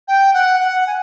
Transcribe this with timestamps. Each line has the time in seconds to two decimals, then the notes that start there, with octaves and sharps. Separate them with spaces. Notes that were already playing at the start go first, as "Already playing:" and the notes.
0.08 G5
0.34 F#5
0.60 F#5
0.87 G#5